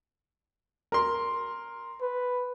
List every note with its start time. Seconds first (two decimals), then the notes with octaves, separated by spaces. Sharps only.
0.92 A#4 C6
2.02 B4